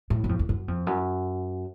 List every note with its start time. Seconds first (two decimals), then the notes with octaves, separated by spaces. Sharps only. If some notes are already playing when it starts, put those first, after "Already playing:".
0.10 A2
0.24 F#2
0.29 F2
0.39 F2
0.49 F#2
0.68 F2
0.87 F#2